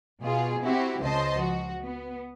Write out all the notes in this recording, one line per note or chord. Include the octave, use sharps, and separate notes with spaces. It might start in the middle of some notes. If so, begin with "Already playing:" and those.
B2 F4 G#4
C4 E4 F#4 G4
C#2 C#3 C5 D#5 A5 C6
F3 F#4
B3